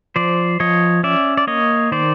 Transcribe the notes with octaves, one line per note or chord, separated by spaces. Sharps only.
F3 C5 D5
F3 C#5 D#5
C#4 D5 E5
D5
A#3 C#5 D#5
D#3 C5 D5